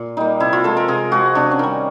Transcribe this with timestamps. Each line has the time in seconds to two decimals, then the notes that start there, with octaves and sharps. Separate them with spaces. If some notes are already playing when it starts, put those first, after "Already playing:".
Already playing: A#2
0.17 G3 A#3 D#4
0.40 C3 E4
0.53 F4
0.64 F3 G#3 A4
0.77 A#4
0.88 C3 G#4
1.12 F3 G#3 F#4
1.35 C3 D4
1.51 C#4
1.59 D#3 G3